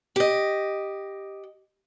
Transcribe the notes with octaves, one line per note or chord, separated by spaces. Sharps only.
G4 D#5